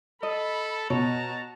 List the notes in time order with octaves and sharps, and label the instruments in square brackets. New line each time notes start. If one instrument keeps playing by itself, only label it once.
[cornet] A4 [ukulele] D#5 [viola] B5
[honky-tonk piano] B2 [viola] F#4 A#5 [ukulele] C#5 [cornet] A5